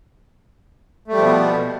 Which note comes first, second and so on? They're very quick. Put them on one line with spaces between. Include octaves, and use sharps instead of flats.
A3 G3 F3 B2 B3